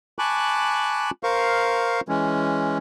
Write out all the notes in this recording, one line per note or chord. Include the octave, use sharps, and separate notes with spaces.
G#5 A5 B5 C#6 D6 F#6
A#4 C5 F5 C#6
E3 G#3 C#4